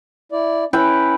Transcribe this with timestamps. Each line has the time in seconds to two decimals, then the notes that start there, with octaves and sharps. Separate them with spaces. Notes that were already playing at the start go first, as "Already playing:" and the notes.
0.32 E4 D5
0.73 C#4 E4 B4 G5